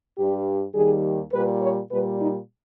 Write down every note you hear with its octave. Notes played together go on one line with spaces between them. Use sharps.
G2 G3 G4
D#2 D#3 G3 G#4
A#2 G3 B4
C#5
A#2 G3 B4
D#4